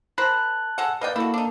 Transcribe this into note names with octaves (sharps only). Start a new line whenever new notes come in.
A#4 C5 A5 B5 F#6
G#3 A4 F#5
A#3 B4 D5 D#5 G5
A#3 E4 F#4 A4
D4 D#4